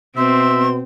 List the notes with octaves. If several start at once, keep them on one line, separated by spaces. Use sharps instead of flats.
B2 C4 E5 C6